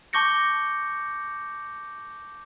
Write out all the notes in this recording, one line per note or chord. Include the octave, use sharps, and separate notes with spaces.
A5 C#6 D6 G6 A#6 C#7